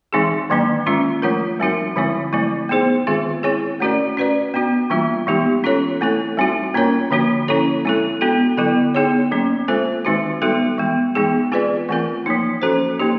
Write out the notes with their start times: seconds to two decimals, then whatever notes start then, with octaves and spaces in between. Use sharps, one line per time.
0.13 E3 G#3 C4 D#4 G#4
0.50 D#3 F#3 A#3 D4
0.87 D#3 G#3 C#4 F4
1.22 F3 A3 D4 F4 A#4
1.60 G3 C4 D#4 F#4 A#4
1.96 D3 F3 G#3 C4 E4
2.33 F#3 A3 C4 E4
2.69 B3 D#4 G#4 C5
3.07 D#3 G#3 C4 F4 G#4
3.43 C4 E4 G#4 C#5
3.80 A3 C#4 F#4 A#4 D5
4.17 C#4 F#4 B4 D5
4.54 B3 D4 F#4
4.90 E3 G3 A#3 D4 F4
5.27 E3 G#3 B3 D#4 G4
5.64 C#4 F4 A4 C#5
6.01 A3 C4 E4 A4
6.37 G3 C4 D#4 F#4
6.74 A#3 C#4 F4 A#4 C#5
7.11 D3 F3 A#3 D4 F#4
7.48 C#4 E4 A4 C#5
7.85 G#3 C4 E4 A4
8.21 B3 D4 F#4 A4
8.57 D3 F#3 B3 E4 A4
8.94 B3 D#4 G#4 C#5
9.31 F#3 A#3 C#4
9.68 G#3 C4 F4 A4 C5
10.05 D#3 G#3 C4 D#4 F#4
10.42 G3 B3 D#4 F#4 A4
10.78 E3 G#3 B3
11.15 E3 G#3 B3 D#4 G#4
11.52 C4 F4 G#4 B4 D5
11.89 E3 A3 C4 F4 A#4
12.26 F3 A#3 D#4
12.62 C#4 F#4 A4 C5
13.00 A#3 D#4 G4